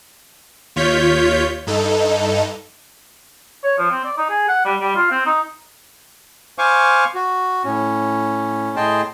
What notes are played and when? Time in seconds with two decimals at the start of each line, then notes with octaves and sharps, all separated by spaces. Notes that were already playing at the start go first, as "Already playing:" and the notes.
0.76 D#2 F4 C#5 G6 B6
1.67 G2 D#4 A4
3.64 C#5
3.78 F3
3.91 C4
4.04 D5
4.17 D#4
4.30 G#4
4.48 F#5
4.65 G3
4.80 G3
4.95 F4
5.11 C4
5.26 D#4
6.58 C5 F5 G#5 C#6 D6
7.15 F#4
7.65 A2 C#4
8.76 A2 G#4 D#5 G5 A5 C6